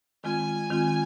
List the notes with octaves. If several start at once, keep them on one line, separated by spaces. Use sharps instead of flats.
D#3 G#3 C4 F4 G#5
D#3 G#3 C4 F4